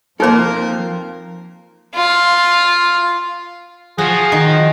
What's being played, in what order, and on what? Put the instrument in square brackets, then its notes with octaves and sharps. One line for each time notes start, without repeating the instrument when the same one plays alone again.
[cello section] F3 [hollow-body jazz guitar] A#3 A4 [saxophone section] C4 F4 A#4 [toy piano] D#4 C5
[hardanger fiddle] F4
[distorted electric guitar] F3 F4 [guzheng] F#4 [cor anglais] G#4
[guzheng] D#3